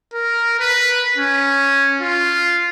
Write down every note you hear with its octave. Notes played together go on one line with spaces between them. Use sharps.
A#4
B4
C#4
F4